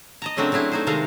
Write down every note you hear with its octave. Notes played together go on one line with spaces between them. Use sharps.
D#5 A5 A#5
C#3 F#3 A3 C4 D4 A#4
F#3 A3 D4 E4 G#4
A3 D#4 C5
C3 D#3 G#3 A4 F5 A#5